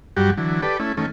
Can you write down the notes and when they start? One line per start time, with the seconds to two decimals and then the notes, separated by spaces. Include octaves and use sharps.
0.17 G2 F#3 G3 F#4 G4
0.38 D3 E3 F#3
0.62 G4 A4 B4 D5
0.80 A3 C#4 E4
0.97 D#3 A3 C#4